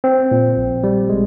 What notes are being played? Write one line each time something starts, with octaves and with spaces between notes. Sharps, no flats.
C4
A#2
A#1
G3
G#3